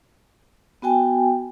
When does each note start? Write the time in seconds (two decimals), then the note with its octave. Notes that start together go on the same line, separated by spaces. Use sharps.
0.82 B3 F#4 G5 G#5